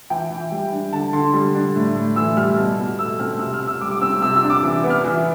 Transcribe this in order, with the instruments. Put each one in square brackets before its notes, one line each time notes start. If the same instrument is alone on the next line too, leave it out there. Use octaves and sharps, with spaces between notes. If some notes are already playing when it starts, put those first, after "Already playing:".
[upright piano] E3 G5
E3
G3
D4
D3 A5
D3 C6
G3
D4
A2
A2
E3 E6
G3 F6
B2
B2
A3 E6
C4 F6
C3 E6
F6
C3
E6
G3 D6
D6
C4 E6
E6
C3 E6
E6
D4
D6
E3 D6
B3
F6
E3